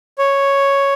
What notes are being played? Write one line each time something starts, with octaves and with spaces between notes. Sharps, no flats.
C#5